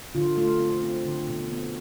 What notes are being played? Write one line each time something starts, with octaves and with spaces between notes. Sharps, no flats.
D3 F4
A3 F4
C4
C4
D3
B2
B3